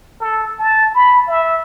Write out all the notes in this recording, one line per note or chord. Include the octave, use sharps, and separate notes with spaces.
A4
A5
B5
E5